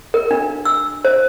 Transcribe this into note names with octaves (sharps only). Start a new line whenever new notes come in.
A#4
D4
E6
C5